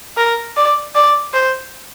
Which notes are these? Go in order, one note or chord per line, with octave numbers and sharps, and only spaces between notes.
A#4
D5
D5
C5